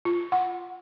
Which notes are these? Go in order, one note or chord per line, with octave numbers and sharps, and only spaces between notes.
F4
F#5